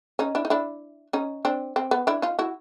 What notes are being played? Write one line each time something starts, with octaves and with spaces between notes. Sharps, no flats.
C#4 D#4
D4 E4
D#4
D4 E4
C#4 D#4
C4 D4
C4
B3
D4 E4
D#4 F4
E4 F#4